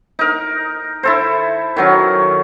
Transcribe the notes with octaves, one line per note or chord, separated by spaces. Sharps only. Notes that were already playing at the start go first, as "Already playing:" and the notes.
D#4 A#4
E4 A4 C5
D#3 F#3 C#4